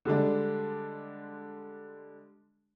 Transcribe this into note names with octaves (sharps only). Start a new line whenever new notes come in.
D3 G3 G#3 D4